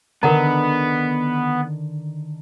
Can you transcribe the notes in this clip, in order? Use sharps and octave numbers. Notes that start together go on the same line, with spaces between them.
D3 D#3 B3 A#4 F#5 A#5